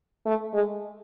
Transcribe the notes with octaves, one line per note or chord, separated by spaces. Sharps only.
A3
G#3